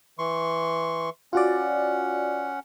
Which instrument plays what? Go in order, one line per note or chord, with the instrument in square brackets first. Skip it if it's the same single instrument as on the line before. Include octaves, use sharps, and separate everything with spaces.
[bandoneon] E3 C6 C#6
[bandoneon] C#4 F#5 [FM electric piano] F4 F#4 D5